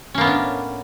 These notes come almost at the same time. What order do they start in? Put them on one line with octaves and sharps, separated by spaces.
C#4 A#3 B3 A2 D4